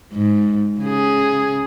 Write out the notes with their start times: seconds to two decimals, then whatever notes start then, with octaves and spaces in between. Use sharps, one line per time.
0.13 G#2
0.80 C#3 G#4